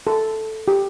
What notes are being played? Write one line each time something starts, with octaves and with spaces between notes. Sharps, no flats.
A4
G4